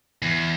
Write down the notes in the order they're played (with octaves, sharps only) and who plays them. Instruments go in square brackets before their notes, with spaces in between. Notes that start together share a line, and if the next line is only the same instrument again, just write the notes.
[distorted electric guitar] E2